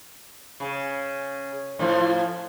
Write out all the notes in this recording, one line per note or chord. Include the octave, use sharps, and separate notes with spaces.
C#3
A2 F3